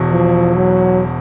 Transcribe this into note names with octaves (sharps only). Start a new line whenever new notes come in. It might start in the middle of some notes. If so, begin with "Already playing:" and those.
Already playing: E1 E2 B2
F3
F#3